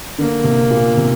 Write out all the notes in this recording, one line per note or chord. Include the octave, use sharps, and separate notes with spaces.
D3 A#3
C3
A#2
C3